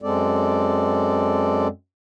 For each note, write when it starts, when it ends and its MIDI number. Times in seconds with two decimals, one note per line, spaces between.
0.02 1.68 42
0.02 1.68 56
0.02 1.68 60
0.02 1.68 69
0.02 1.68 74